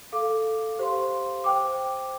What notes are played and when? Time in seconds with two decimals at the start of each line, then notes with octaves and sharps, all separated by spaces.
0.12 A4 F5 D6
0.79 G4 C5 F5 C6
1.44 C5 G5 D6